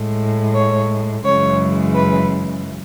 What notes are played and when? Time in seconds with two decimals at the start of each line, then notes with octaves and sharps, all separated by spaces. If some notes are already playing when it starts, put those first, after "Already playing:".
Already playing: A2 G#3
0.54 C#5
1.24 F#2 C#3 E3 G#3 C#5
1.94 B4